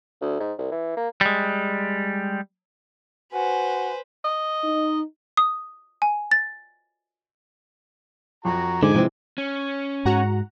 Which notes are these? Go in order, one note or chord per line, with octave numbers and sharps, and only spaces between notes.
D2
G#2
C2
E3
A#3
G3 G#3
F#4 B4 C5 G#5
D#5
D#4
D#6
G#5
A6
F2 F#4 A#5
G#2 D3 G#5 D6
C3 E3 F3 G#3 C4
C#4
G#2 F#4 F#5 A#5